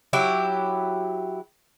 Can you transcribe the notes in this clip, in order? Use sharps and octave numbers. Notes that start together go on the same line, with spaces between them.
F#3 E4 G4